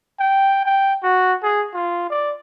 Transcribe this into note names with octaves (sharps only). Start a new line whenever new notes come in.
G5
G5
F#4
G#4
F4
D5